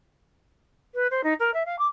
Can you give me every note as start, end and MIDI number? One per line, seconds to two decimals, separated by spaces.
0.94 1.07 71
1.11 1.21 72
1.23 1.33 63
1.39 1.51 70
1.54 1.63 76
1.65 1.76 77
1.79 1.86 86